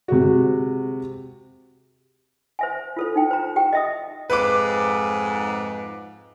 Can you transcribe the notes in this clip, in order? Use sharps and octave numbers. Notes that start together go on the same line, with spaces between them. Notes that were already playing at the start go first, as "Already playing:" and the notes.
C3 G#3 F#4
C5 E5 G#5
F4 A4 C5
D#4 G5
C5 A#5
G4 G5
D#5 E5 D#6
F2 G#2 B4 D6